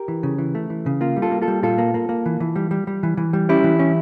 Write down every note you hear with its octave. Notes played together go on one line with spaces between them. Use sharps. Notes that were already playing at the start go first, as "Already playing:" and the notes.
Already playing: G4 A#4
E3
C#3
E3
A3
E3
C#3
A#3 F4
G3
F4 A4
A#3
F4 A4
G3
A#2 F4 A4
A#3
A#3
A#3
E3
E3
G3
G3
G3
E3
E3
G3
C#4 E4 G4
E3
C#4